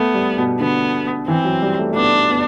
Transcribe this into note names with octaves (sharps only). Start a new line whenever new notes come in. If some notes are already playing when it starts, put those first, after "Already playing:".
Already playing: A3 B3
G3
B2
D3 B3
E3 C4
F#3
G3
A3
A3
B3 D4
B3